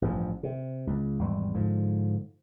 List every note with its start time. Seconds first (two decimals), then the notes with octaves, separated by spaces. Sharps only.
0.02 A1 G2 F3
0.43 C3
0.87 C#2
1.19 G#1 E2 G3
1.54 G#2 D3 F3